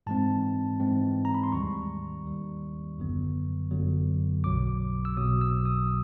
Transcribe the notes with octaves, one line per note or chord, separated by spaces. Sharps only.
G#2 E3 G#3 C4 A5
G#2 E3 G#3 C4
A#5
B5
C6
D#2 D#3 G3 C#6
D#2 D#3 G3
G1 F#2 D3 F#3 B3
G1 F#2 D3 F#3 B3
B1 B2 F#3 D6
E6
B1 B2 F#3 D#6
E6
D#6